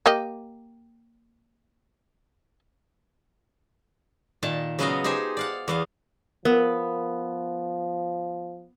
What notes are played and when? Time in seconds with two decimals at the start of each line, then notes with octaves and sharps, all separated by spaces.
0.06 A#3 G4 D#5
4.43 A#2 D#3 A5
4.79 C#3 F#3 B3 F#4 D#5 F5
5.04 D#4 G4 G#4 C5 G#5
5.37 D5 F5 F#5
5.68 E2 B3 F5
6.45 F3 B3 A#4